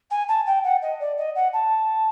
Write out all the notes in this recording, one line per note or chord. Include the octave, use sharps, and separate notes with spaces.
G#5
A5
G5
F#5
D#5
D5
D#5
F#5
A5